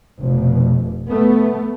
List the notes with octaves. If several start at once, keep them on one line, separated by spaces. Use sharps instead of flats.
F1 B2
A3 B3